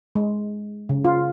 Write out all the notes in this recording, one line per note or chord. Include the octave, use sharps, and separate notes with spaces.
G#3
C#3
F4